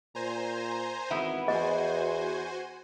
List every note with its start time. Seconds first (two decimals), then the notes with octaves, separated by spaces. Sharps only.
0.15 A#2 C5 G#5 A#5
1.11 G#1 E3 B3 E5
1.48 E2 F#4 C5 D#5 G#5